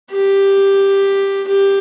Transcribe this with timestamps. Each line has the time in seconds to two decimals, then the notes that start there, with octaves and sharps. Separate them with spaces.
0.11 G4
1.47 G4